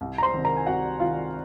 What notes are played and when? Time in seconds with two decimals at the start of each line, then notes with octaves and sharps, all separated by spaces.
0.01 C2
0.18 A#5
0.22 C5 C6
0.34 C3 D#3
0.44 A#4 A#5
0.56 G#5
0.66 C2 F#4 F#5
1.00 C3 D#3 F4 F5